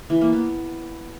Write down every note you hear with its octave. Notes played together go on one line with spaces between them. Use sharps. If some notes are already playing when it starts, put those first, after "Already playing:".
E3
A#3
B3